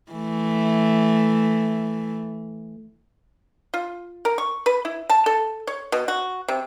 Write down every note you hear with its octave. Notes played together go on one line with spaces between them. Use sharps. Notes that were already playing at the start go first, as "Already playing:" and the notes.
E3 A3
F4
A#4
C#6
B4
E4
A5
A4
C#5
B2
F#4
C3